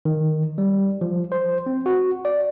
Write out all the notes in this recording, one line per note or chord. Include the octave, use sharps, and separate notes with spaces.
D#3
G3
F3
C5
C4
F#4
D5